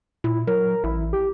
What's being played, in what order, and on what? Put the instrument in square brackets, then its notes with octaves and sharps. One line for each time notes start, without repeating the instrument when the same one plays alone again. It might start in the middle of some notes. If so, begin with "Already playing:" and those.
[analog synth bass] A#2 [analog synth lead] E4
[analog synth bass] F#3 [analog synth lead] A#4
[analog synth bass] A1 [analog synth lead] E4
[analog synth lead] G4